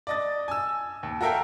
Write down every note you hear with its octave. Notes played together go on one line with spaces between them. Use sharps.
D5 D#5 A6
G#5 E6
D#2
F#4 A4 A#4 E5 F5 G5